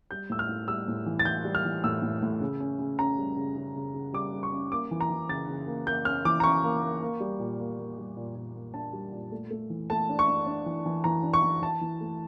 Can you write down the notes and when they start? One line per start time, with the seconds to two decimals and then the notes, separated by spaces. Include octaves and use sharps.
0.11 G3 G6
0.30 A2 E6
0.39 F6
0.49 A2
0.68 G3 E6
0.88 A2
1.06 E3
1.19 A6
1.25 E3 G6
1.45 G3
1.55 F6
1.65 E3
1.84 A2 E6
2.02 A2
2.23 A2
2.41 C#3
2.60 C#4
2.79 C#3
2.98 C#4 A#5
3.18 G3
3.36 C#3
3.57 C#3
3.76 C#3
3.94 C#3
4.13 G3 D6
4.33 G3
4.43 C#6
4.53 C#4
4.71 A#3 D6
4.91 E3
5.01 A#5
5.10 E3
5.29 C#3 A6
5.48 C#3
5.67 A#3
5.87 A#3 G6
6.05 C#4 F6
6.25 E3 D6
6.40 A#5
6.44 C#4 C#6
6.64 A#3
6.83 A#3
7.02 A#3
7.20 G3
7.39 A#2
7.59 A#3
7.79 A#3
7.98 G3
8.17 A#2
8.35 A#2
8.55 A#3
8.74 D4 A5
8.93 G3
9.12 A#2
9.32 A3
9.51 A3
9.70 E3
9.90 A3 A5
10.09 D4
10.19 C#6
10.27 D4
10.46 D4
10.66 E3
10.86 E3
11.04 E3 A#5
11.23 D4
11.34 C#6
11.43 E3
11.62 E3 A5
11.81 E3
12.01 A3